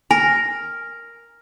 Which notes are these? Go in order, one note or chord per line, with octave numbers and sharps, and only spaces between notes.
A#4 G#5